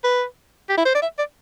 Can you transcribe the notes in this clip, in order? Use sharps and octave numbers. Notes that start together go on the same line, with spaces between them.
B4
G4
E4
C5
D5
E5
D5